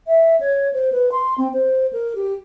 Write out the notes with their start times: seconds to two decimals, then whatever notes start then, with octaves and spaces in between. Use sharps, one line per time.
0.07 E5
0.40 C#5
0.73 C5
0.92 B4
1.12 C6
1.38 C4
1.53 C5
1.93 A#4
2.16 G4